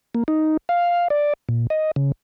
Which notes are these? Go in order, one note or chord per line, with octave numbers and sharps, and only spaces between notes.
A#3
D#4
F5
D5
A#2
D#5
C#3